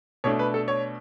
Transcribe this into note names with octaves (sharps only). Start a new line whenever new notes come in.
B2 A3 D4 C#5
B4
A4
C#5